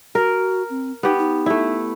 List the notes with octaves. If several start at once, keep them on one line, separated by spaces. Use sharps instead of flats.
F#4 A#4
C4
B3 D#4 G4
D#4
A3 E4